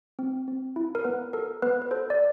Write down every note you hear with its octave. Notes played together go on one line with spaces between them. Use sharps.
C4
C4
E4
A#4
B3 B4
A4 A#4
B3 B4
B4
A4 C5
D5